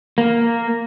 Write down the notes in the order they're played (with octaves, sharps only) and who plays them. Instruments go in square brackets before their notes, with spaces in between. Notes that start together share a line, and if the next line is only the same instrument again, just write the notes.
[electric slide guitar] A#3